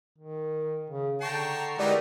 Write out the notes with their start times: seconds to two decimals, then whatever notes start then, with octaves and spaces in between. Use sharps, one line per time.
0.18 D#3
0.90 C#3
1.21 D3 G5 A5 A#5 C#6 C7
1.79 E3 G#3 B3 D#4 G4 A#4 D5